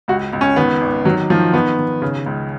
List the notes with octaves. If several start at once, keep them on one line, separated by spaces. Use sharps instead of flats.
C#2 F#4
C#2
C#4
D#3 B3
G#1
D#3 F#3
D#3 F3
D#3 B3
D#3
C#3
C#2